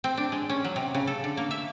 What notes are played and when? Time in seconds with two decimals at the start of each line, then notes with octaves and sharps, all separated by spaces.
0.04 C4
0.17 D4
0.32 G#3
0.50 C#4
0.65 F#3
0.76 C3
0.94 C#3
1.07 A4
1.24 D3
1.37 A#3
1.51 E5